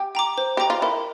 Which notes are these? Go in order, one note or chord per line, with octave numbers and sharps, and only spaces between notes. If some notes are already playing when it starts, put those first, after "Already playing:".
Already playing: G4
G5 A#5 D6
C5
G4 G5 A#5 D6
F4
E4 A#4